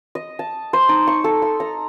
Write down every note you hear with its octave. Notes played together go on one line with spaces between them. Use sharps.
D#5
A5
C5
D#4
C#6
A4
C6
A#5